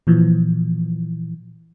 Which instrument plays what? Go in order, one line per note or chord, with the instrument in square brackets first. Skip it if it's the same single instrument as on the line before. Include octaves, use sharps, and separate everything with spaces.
[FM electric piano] A#2 E3 F3